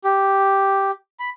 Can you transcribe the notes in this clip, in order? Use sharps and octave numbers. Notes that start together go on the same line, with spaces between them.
G4
B5